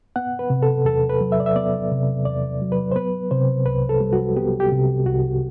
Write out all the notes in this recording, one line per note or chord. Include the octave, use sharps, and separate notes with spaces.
B3 F#5
B4
C3
A4
E2 A4
B4
F#3
E5
D5
E5
B3 D5
C3
E2 D5
F#3
B4
C5
B3 B4
C3 C5
C2 B4
A4
G3
F#4
B3 G4
G4
C3
C2 F#4